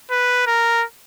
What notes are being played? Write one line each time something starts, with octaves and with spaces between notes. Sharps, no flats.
B4
A#4